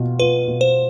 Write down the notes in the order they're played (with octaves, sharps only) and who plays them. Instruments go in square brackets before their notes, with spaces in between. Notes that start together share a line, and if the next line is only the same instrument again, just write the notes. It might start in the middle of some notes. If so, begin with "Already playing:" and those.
Already playing: [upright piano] B2 F4
[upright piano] F4 [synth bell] B4
[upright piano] B2
[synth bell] C5